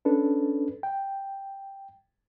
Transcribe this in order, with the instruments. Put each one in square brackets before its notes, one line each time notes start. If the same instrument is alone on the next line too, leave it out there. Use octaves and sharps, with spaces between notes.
[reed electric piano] C#4 D4 A4 B4
G5